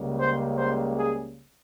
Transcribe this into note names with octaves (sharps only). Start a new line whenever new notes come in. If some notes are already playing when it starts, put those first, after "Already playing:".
Already playing: C#2 C#3 G3 A#3
C5
C5
G#4